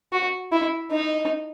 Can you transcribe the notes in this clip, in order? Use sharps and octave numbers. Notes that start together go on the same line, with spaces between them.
F#4
E4
D#4